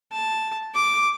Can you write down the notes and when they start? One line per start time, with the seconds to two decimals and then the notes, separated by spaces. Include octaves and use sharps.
0.12 A5
0.75 D6